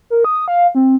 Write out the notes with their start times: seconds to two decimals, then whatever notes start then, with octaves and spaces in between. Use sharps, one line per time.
0.10 A#4
0.25 D#6
0.48 F5
0.75 C4